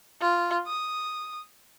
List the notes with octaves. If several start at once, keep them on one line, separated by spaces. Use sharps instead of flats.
F4
D#6